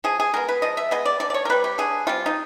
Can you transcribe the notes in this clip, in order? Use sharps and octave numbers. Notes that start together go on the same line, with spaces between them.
F3 G#4
G#4
G#3 B3 A#4
B4
F3 D#5
E5
G#3 B3 D#5
D5
D3 D5
D5
C#5
A#4
G3 C4 B4
G4
D3 G#4
G3 C4 F4
D#4